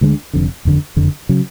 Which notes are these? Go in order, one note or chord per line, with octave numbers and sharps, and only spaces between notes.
D2 D3 G#3 D4
F1 F2 D3
F#1 F2 D3
F#1 F2 D3
C#3 F#3